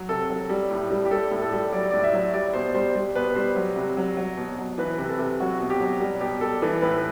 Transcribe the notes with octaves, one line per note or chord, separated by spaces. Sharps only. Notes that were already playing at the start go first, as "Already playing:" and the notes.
Already playing: F#3
C3 A4
F#3
G3
A2
G3
G4
G3 A4
A2
A4
G3
F#3 D5
A2 D5
E5
F#3
G3 D5
B2 C5
G3 C5
G3
B2 B4
G3 C5
F#3
C3
F#3
F#3
B2
F#3
E3 B4
C3
A4
C3
F#3 F#4
B2
G4
F#3
G3
B2 G4
G3 A4
E3 A4
A2 B4